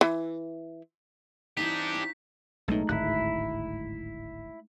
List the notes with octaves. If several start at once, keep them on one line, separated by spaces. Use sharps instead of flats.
E3
E3 C4 D4 D#4 G4 B6
C#5 F5 A5
B1 A2 G#3 A3 D#4
D1 G#1 E4 F#6